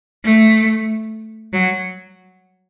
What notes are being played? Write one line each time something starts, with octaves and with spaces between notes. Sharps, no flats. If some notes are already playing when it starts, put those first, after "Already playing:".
A3
F#3